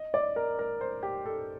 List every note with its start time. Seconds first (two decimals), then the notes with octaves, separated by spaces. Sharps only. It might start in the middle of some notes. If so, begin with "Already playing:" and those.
Already playing: D#5
0.14 D5
0.36 A#4
0.59 A#4
0.81 C5
1.03 G4
1.26 A4